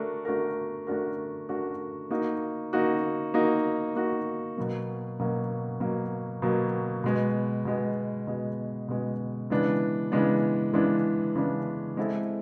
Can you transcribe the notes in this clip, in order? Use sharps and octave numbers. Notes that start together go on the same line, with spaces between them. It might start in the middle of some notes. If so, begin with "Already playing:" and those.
Already playing: A3 D4 F#4 A#4
A3 D4 F#4 A#4
A3 D4 F#4 A#4
A3 D4 F#4 A#4
A#3 D#4 F#4
A#3 D#4 F#4
A#3 D#4 F#4
A#3 D#4 F#4
B2 F#3 A#3
B2 F#3 A#3
B2 F#3 A#3
B2 F#3 A#3
B2 G#3 B3
B2 G#3 B3
B2 G#3 B3
B2 G#3 B3
C#3 E3 G#3 B3 D4
C#3 E3 G#3 B3 D4
C#3 E3 G#3 B3 D4
C#3 E3 G#3 B3 D4
G#3 C4 E4 A4